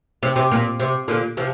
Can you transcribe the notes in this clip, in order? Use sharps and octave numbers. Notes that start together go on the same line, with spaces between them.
C3
C3
A#2
C3
A#2 D3
C3 F3